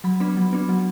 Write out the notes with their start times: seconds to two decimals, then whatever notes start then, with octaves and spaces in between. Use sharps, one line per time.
0.04 F#3 B5
0.20 B3 D4 B5
0.37 F#3
0.53 B3 D4
0.69 F#3